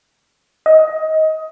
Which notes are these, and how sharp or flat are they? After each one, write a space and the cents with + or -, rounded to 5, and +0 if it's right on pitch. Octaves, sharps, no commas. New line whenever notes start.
D#5 +20